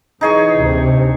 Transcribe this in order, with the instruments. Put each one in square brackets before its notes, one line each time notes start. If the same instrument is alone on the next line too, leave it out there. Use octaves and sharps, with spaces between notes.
[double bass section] E3 [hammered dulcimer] D#4 G#4 C#5
[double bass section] D2 C3